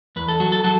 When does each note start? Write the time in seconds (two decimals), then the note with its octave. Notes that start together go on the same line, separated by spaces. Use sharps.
0.16 E2 B4
0.28 A4
0.40 F#3 F#4
0.52 A4
0.64 F#3 A4